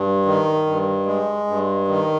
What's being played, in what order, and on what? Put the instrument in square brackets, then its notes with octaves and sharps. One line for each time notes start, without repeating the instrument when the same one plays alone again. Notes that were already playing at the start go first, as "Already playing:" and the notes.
Already playing: [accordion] G2
D#3
G2
G#3
G2
D#3